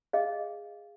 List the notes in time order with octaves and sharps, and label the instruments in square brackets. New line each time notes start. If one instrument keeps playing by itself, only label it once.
[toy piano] G#4 D#5 F5